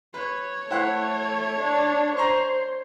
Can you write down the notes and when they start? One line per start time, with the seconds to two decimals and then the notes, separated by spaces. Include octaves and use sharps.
0.14 B4 C#5
0.70 A3 E4 C5 F#5
1.60 D4
2.17 C5 A#5 C6 C#6